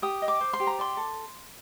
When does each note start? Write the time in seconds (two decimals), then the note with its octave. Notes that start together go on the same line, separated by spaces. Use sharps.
0.02 G4 D#6
0.22 D#5
0.28 D6
0.41 C5
0.53 C6
0.60 G4
0.67 A#5
0.79 D5 C6
0.97 A4